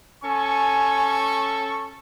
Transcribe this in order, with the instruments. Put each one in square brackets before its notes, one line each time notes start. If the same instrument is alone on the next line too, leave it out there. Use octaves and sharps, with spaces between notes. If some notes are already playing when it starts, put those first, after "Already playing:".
[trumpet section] C#4 A4 C#6 [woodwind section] G#5